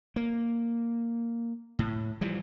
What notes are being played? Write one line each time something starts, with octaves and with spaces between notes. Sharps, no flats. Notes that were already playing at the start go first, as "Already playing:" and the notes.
A#3
A2
E3 F3 G3